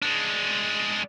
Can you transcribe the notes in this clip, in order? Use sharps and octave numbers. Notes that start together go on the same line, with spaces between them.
G#3 D4